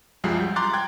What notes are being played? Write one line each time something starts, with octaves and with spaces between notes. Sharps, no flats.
C2 F#2 F3 G3 G#3 C7
G6
A#5 C6 D6 F#6 A6
G5 F#6 G#6